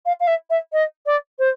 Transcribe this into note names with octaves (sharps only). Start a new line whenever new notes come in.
F5
F5
E5
E5
D#5
D5
C5